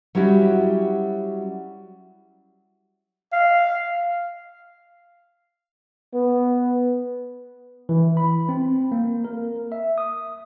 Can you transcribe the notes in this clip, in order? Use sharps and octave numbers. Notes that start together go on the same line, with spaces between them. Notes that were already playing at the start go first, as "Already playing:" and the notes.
F#3 G3 C#4 E4 F#4
F5
B3
E3
B5
C4
A#3
A#4
E5
D#6